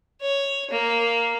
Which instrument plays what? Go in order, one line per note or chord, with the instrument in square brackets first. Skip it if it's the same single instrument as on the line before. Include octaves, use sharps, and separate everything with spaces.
[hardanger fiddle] C#5
A#3